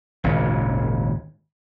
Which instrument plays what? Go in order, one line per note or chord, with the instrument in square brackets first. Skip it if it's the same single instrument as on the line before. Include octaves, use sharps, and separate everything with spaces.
[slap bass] G#1 D#2 A#2 C#3